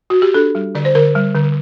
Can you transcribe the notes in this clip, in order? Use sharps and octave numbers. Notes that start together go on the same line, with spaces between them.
F#4
G4
D4 A4
G3
D3 D5
C5
D3 A#4
G3
D3